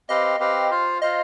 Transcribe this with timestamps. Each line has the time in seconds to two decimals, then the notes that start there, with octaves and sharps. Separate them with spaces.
0.09 C4 G4 B4 D#5 F5
0.39 C4 G4 B4 F5
0.71 F4 C5 F5
1.02 F4 C5 D#5 F5